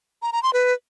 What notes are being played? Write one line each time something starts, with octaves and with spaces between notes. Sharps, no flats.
A#5
A#5
C6
B4